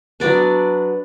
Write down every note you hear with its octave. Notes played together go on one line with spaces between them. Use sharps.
F#3 B3 D4 B4 D5